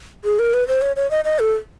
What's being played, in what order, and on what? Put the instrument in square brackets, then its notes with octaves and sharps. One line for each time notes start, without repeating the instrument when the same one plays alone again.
[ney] G#4
A#4
B4
C5
C#5
C#5
D#5
D#5
A4